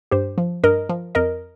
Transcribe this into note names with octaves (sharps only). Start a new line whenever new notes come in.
G2 G4 C5
F3
G2 A#4 D#5
F3
F2 A#4 D#5